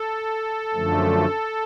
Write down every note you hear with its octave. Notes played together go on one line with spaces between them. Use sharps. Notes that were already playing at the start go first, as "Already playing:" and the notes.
Already playing: A4
F#2 D3 F3 A3